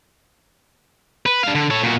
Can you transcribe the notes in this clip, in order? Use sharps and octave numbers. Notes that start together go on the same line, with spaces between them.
B4
D4 F5
D3
A4 C#5
A#2 F#4